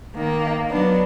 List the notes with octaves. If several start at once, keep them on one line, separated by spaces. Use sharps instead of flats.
D#3 A#3
F#3 B3 D4